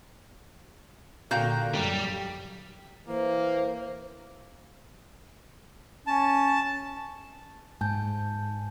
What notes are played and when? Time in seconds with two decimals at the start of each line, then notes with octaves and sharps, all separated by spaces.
1.31 A#2 D3 A#3 F#4 F5 G5 G6
1.75 F#2 G3
3.08 E3 A#3 C5
6.07 C#4 A5
7.81 G#2 G#5 A5 G6